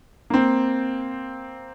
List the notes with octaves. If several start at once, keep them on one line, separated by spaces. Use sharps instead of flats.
A#3 C4